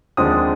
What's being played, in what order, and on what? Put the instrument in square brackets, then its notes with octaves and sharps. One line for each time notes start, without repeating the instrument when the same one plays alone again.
[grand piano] D#2 D3 F3 G#3 C4 D#6